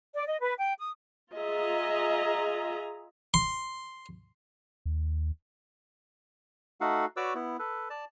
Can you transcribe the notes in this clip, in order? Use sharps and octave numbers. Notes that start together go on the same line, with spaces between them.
D5
D#5
B4
G5
D#6
F4 G#4 D#5 E5 A#5
C6
D#2
A3 D#4 F#4 A4 F5 F#5
F#4 B4 C#5 D5 D6 E6
B3 E4
A4 B4
D5 A5